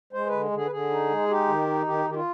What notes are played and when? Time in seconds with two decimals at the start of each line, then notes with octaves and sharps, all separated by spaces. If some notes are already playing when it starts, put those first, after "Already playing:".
0.13 G#3 C5
0.27 B4
0.32 D3
0.51 D3
0.56 G#4
0.66 B4
0.71 D3 G#4
0.90 D#4
1.10 G#3
1.28 D#4 G4
1.48 D#3
1.67 D#4
1.86 D#3 G4
2.05 D#3 G4
2.15 F4